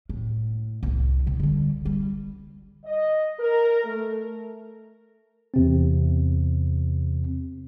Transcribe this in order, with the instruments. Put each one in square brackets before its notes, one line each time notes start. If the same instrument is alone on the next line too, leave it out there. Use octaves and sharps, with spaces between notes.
[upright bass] A2
C2 A3
C2 C3
D3 G3
G3
[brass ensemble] D#5
A#4
A3
[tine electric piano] E2 C3 C4